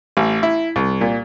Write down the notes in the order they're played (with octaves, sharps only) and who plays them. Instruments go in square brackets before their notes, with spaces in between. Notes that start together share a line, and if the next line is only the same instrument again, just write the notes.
[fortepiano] A1
E4
C2
A#2